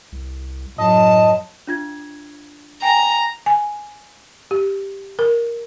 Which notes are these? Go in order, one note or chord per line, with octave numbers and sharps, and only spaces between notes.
C2
F#2 A2 D#5 A5
D4 F4 G#6
G5 G#5 A#5
G#5
G4
A#4